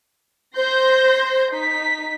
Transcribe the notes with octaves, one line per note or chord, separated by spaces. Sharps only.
C5 C6 G6 A#6
D#4 B6